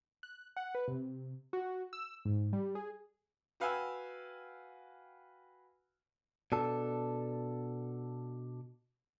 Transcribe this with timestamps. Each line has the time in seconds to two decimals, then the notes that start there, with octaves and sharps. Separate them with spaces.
0.23 F#6
0.56 F#5
0.75 B4
0.88 C3
1.53 F#4
1.93 E6
2.25 G#2
2.53 G3
2.75 G#4
3.60 F#4 B4 F5 G5 G#5 E6
6.52 B2 D4 A4